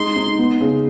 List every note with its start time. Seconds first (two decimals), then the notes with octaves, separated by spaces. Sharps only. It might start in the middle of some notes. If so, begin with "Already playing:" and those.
Already playing: G#3 D#4 C6
0.16 D#4
0.39 B3
0.61 C#3